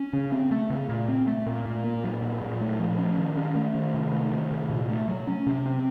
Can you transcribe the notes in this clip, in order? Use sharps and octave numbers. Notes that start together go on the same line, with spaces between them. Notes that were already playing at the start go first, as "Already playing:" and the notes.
Already playing: C#4
C#3
C4
A3
C#3
A#2
C4
A3
A#2
A#2
A#3
F#3
A#2
A#2
A3
F3
C#4
D#3
C#4
A3
D#3
C3
A3
D#3
C3
A#2
A3
F#3
C#4
C3
C4